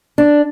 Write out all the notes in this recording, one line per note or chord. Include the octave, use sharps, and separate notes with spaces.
D4